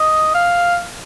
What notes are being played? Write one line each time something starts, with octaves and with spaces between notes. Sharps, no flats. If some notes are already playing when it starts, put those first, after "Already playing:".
Already playing: D#5
F5